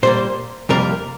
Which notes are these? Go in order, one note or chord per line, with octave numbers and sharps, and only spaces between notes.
A#2 G3 A#3 C5
F2 C3 G3 A#3 A#4